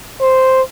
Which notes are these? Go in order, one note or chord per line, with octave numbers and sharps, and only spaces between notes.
C5